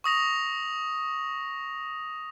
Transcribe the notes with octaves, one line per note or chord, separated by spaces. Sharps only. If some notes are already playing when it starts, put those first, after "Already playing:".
C#6 D#6 A#6 F7